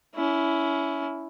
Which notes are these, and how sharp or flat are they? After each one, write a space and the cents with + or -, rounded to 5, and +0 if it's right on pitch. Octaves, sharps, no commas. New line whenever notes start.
C#4 +25 E4 +0